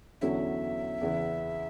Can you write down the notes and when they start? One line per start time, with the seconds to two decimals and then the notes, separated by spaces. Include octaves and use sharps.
0.21 E2 D3 F#3 C#4 E4 E5
1.01 E2 C#3 E3 B3 E4